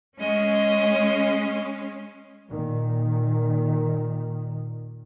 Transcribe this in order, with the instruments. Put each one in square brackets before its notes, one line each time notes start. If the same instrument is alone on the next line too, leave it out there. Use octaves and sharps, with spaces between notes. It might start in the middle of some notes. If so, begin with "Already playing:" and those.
[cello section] G#3 C#4 [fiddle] D#5
[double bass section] A#2 D#3